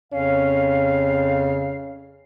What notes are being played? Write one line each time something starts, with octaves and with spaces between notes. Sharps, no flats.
F2 C#3 C#4 F5